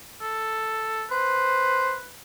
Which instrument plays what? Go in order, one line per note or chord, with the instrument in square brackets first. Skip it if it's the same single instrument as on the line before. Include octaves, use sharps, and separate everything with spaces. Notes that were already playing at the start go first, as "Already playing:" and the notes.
[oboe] A4
[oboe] B4 [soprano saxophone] C5